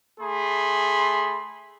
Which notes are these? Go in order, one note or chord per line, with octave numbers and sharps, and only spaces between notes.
A3 G#4 B5 C6